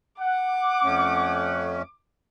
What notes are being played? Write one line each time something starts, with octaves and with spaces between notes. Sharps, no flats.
F#5 D6
F2 A3 C#4